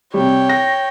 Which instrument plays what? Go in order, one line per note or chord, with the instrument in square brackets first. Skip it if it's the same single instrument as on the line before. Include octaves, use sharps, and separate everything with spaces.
[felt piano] C3 G3 [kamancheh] C#5 G5
[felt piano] A#6